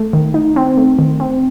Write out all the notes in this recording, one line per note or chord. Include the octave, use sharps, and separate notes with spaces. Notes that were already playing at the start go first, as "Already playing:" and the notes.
Already playing: A3
D#3
D#4
C4
A3
D#3
C4